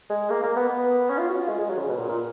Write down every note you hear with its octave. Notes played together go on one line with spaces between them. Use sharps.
G#3
A#3
A#3
B3
B3
C#4
F4
F#4
F4
G#3
G#3
F#3
C#3
B2
A#2
A#2